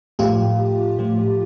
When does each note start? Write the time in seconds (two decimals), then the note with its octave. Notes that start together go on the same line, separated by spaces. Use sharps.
0.19 A2 F3 A3 F4 G4
0.98 A2 F3 A3